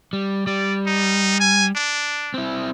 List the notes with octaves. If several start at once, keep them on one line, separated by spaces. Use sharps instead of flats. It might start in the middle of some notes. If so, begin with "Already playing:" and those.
G3
G3 D5
D#4
G#5
D4
C4 E4